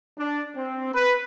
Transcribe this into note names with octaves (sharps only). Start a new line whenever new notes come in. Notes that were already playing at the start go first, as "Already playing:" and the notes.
D4
C4
B4